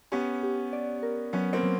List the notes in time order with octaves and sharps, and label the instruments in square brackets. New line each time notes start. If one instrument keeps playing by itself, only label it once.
[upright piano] B3 C#4 [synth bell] G4
[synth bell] G4
D5
A#4
[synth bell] F#3 [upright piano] B3 C#4
[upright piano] A#3 C4
[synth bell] F#3